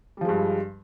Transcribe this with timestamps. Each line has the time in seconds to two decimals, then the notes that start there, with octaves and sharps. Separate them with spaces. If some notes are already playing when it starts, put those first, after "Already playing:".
0.17 G3
0.21 F3
0.25 G#3
0.29 G2